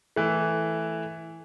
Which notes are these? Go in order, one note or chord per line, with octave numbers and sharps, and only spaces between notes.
E3 A3